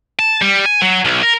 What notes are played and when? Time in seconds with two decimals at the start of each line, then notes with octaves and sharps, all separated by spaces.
0.19 A5
0.41 G3
0.65 G#5
0.82 F#3
1.05 B1
1.23 A#4